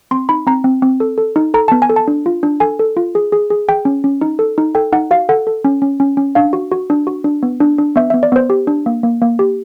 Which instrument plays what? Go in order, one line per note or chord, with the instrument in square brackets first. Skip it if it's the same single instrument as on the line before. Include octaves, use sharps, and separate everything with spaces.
[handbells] C4 C6
D#4 B5
C4 A#5
C4
C4
A4
A4
D#4
A4 A#5
B3 A5
G#5
A4
A5
D4
F4
D4
A4 G#5
A4
F4
G#4
G#4
G#4
G#4 G5
C#4
C#4
D#4
A4
D#4
A4 G5
D#4 F#5
F#4 F5
A4 F#5
A4
C#4
C#4
C#4
C#4
D4 F5
F#4
F#4
D4
F#4
D4
B3
D4
D4
B3 E5
B3 E5
D5
B3 C5
G4
D4
A#3
A#3
A#3
G4